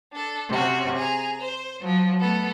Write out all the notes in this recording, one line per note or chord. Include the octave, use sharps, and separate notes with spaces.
D4 A4
C3 C#4 F#4
G#4 A#5
C5
F3 F#3
A3 B3 A4